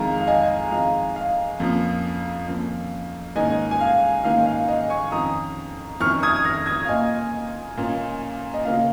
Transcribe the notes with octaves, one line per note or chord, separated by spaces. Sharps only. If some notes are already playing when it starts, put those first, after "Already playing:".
Already playing: F2 D#3 G#3 F5 A#5
F5
D#5 G#5
F2 D#3 G#3 F5
F5
F2 F3 A#3 C#4
F2 F3 A#3 C#4
G#2 D#3 A#3 C#4 D#5 G#5
G#5
F5
G#2 D#3 A#3 C#4 F5
F5
D#5
G#5 C#6
F2 D#3 C#4 A#5 D#6
F2 D#3 C#4 C#6 F6
D#6 G#6
F6 A#6
D#6 G#6
F5
A#2 A#3 C#4 D#5 G#5
A#2 A#3 C#4
D#5
C#3 A#3 C#4 F5